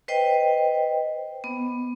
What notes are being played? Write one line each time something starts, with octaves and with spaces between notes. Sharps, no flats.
B4 C5 D#5 G5
B3